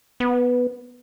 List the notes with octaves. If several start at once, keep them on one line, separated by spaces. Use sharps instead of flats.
B3